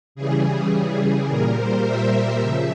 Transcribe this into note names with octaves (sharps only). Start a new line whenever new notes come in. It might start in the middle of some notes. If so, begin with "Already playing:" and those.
C#3 E3 G3 G#4
A#2 G3 A#4
C5
E5
C#3 F3